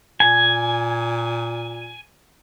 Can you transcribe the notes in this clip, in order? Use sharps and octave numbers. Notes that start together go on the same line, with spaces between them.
A#2 G#5